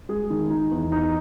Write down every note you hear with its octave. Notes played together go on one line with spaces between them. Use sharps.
G#3 G#4
D#3
D#4
E2
D#4